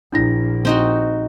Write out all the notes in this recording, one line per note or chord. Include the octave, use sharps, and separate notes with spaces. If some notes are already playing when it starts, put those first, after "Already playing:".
A#1 D4 E4 A#6
C4 D#4 F#4